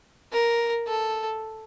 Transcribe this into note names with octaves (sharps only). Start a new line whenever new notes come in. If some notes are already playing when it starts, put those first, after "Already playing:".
A#4
A4